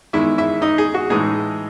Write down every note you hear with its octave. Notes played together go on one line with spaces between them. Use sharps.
E2 D#3 G#3 E4 E5
E4 E5
D#4 D#5
G#4
F#4
A2 E3 G#3 D#4 G#4